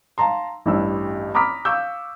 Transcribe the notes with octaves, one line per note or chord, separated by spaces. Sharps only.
F5 A5 A#5 C6
A1 G2 E6
A#5 B5 D6 D#6 F6 B6
F5 C#6 D6 E6 G6